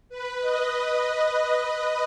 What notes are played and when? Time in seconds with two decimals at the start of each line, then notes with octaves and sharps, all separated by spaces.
0.09 B4
0.40 D#5